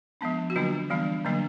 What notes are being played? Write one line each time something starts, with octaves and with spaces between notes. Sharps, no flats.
F3 G#3 B3 D4
F#4
D3 F#3 A#3 D4 F4
E3 G3 B3 D4
D3 F#3 A#3 D4